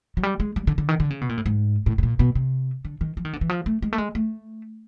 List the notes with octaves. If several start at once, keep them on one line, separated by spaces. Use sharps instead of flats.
F#3
G3
G#3
G3
D3
D3
D#3
D3
C#3
B2
A#2
A2
G#2
A2
A2
A#2
B2
C3
D3
D#3
F3
D#3
D3
E3
F3
A3
G#3
A3
G#3
A3